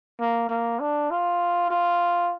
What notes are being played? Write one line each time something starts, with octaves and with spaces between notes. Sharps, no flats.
A#3
A#3
D4
F4
F4